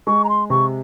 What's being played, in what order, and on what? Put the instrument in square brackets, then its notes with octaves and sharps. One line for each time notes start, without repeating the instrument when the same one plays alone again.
[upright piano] G#3 [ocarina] C#6
[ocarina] A#5
C6
[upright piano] C3 [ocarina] C#6